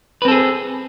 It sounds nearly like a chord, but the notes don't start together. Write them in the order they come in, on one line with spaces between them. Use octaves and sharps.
B4 C4 A4 G#4